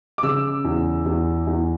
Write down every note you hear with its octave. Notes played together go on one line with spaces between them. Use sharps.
D6
C#3 E6
E2
E2
E2